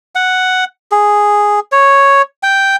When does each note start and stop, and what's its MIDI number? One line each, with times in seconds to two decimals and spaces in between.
0.15 0.65 78
0.91 1.60 68
1.72 2.22 73
2.43 2.76 79